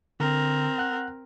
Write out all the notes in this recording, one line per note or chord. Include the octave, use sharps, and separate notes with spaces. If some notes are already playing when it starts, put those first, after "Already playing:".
D3 C4 A#4
F#5 F#6